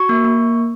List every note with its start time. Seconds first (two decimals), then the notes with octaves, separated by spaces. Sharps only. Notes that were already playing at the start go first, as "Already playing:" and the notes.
Already playing: F#4 C#6
0.09 A#3
0.24 A#3